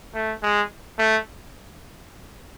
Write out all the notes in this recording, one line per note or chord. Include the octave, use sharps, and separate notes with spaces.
A3
G#3
A3